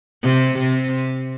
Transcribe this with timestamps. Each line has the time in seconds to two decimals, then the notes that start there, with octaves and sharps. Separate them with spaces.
0.24 C3
0.59 C3